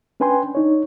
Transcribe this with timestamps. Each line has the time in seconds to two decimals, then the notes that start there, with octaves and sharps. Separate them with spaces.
0.20 C#4 D4 B4 G5 G#5 C6
0.55 D4 D#4 C#5